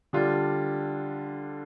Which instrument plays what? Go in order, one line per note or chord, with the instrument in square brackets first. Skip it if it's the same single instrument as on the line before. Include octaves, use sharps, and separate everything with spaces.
[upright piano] D3 G3 D4 F4